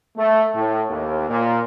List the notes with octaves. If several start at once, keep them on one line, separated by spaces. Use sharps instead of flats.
A3
A2
D#2
A#2